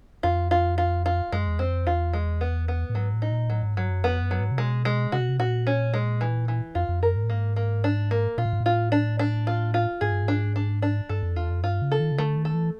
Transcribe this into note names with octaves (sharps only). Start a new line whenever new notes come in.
F2 F4
F4
F4
F4
F#2 G#3
E2
F2 C4
E2 F4
G#3
B3
B3
A2
G#2 F#3
A2
D#4
A#2
A2 F#3
G#2
G2 F#3
F#2
F2 B3
F#2
F#3
G#2
C3
B2 G#3
G#3
C3 F#4
B2
C3
A#2 F#4
C#4
G#3
E3
E3
F2 F4
F2
F#2 A#4
G#2
A2
G#2 A#3
A#3
D4
A#3
A#2 F4
A2
G#2
A2
F4
D4
D4
F4
F4
G#2 G#4
G2
G#2
D4
D4
D4
G2 A4
F2
E2 F4
F2
G2 F4
C#3
A4
D#3
C#3
D3 A3
D#3
A4
E3